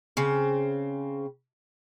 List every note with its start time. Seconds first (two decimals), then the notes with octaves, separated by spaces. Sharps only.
0.17 C#3 C4